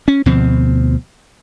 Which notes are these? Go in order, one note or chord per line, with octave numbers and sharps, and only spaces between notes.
C#4
D2 B2 F3 C4